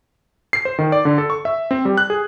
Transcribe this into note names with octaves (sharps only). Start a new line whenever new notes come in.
C7
C5
D#3
D5
D3
A4
C#6
E5
C4
G3
F#6
G#4